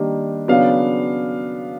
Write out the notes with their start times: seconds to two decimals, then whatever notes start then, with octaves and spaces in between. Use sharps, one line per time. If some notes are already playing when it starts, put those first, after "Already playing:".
Already playing: D#3 G3 A#3 D4
0.48 C#3 F#3 B3 D4 F5